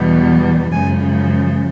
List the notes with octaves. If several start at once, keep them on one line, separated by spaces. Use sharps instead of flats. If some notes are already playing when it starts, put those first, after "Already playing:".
Already playing: E2 B2 G3
F#2 C#3 F3 G#3 G#5